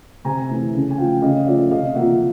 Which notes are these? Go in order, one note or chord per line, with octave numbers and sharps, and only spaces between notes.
C3 G#5 A#5
E3 A3
C#3
G#5
F3 A3 F5 G5
C#3 D#5 F5
F3 A3 D5 E5
C3 D#5 F5
F3 A#3 E5 F#5